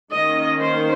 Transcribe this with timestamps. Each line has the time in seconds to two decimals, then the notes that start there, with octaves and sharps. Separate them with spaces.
0.13 D#3 A#3 C#4 D#5
0.60 C5